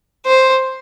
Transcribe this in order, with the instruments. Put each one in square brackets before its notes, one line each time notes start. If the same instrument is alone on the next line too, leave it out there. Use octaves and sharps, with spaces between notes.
[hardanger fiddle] C5